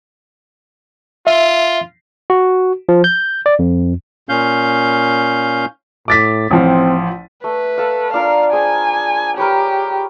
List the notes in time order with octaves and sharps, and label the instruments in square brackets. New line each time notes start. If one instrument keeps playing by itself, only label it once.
[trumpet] F4 [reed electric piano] E5
[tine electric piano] F#4
F3
G6
D5
F2
[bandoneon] A#2 C#4 F5 G6
[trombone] A2 [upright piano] D6 A6 B6
[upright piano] A1 F3 [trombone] C4
[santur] A3 [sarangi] B4
[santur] A4 F5
[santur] D4 F4 A#4 [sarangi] F5
[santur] G#4 C5 G5 [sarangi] G#5
[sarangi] G4 [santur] A#4 B4 C#5